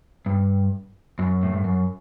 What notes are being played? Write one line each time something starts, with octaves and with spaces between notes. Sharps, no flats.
G2
F#2
A2
G2
F#2